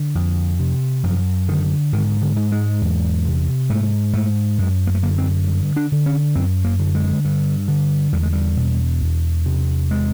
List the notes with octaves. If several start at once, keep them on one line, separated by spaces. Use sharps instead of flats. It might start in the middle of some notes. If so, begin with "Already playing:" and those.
Already playing: D3
F2
C3
F#2 F3
D3 D#3
G#2 D#3
D3
G#2
G#3
E2
C3
G#2 A3
G#2 A3
F#2 G#3
A#3
A3
D3 A#3
C4
G2
D4
D3
C#4
F#2 C4
A#3
D3
G#3
G2
D3
E2 G3
G#3
G3
B2
E2
C3
G#3